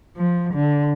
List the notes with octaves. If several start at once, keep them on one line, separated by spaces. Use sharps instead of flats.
F3
D3